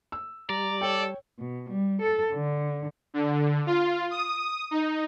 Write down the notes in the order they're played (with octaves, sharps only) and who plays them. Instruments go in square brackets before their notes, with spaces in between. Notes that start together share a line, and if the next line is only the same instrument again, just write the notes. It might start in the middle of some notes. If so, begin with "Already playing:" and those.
[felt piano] E6
[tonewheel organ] G3 [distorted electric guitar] D5 [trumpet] A#5
[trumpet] A4 [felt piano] C#5 G5
[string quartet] B2
G3
A4
D3
[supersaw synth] D3
F4
D#6
D#4